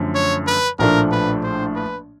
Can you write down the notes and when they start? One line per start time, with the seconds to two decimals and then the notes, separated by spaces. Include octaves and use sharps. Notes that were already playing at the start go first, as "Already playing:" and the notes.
Already playing: F#2 D3 F3 A3
0.15 C#5
0.47 B4
0.79 A#1 A2 F3 A3 D4 A#4
1.11 B4
1.43 C5
1.75 B4